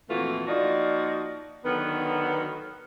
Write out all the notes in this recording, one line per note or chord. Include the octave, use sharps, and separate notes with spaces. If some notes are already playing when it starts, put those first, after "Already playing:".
F2 A#2 E3 A3 F4 F#4
F3 A#3 D#4 F#4 D5
D3 D#3 F#3 B3